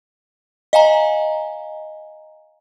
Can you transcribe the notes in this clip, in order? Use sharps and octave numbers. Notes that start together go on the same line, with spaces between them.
D#5 F5 G#5 A#5